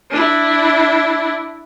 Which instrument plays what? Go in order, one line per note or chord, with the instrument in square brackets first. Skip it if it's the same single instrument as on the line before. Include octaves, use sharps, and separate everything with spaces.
[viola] D4 E4